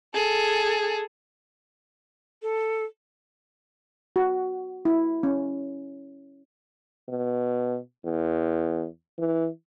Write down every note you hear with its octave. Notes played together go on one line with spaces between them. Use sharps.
G#4 A4
A4
F#4
E4
C#4
B2
E2
E3